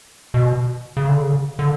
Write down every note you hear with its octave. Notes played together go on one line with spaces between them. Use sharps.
B2
C#3
D3
C#3
D3